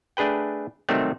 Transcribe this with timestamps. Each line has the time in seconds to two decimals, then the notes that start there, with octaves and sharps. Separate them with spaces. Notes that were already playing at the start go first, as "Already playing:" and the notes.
0.17 A3 D4 G#4 B4 G5
0.89 C3 D#3 F#3 G3 A3 C4